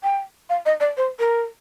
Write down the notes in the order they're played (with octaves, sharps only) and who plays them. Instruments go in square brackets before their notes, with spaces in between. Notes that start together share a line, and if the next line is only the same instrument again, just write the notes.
[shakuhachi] G5
F5
D#5
D5
C5
A#4